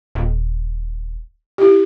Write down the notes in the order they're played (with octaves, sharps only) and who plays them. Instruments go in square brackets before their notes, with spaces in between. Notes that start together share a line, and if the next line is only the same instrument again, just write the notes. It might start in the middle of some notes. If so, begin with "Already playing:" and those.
[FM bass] D#1
[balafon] E4 G4